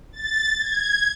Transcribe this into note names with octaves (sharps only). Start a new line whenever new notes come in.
A6
G#6